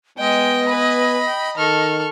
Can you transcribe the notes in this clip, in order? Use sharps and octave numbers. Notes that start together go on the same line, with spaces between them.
G#3 B3 D#5 G5
B4 G#5 B5
G5
D#3 A4 C#6 F6